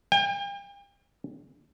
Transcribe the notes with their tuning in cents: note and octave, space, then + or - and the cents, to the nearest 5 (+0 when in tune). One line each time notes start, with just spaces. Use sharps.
G5 +40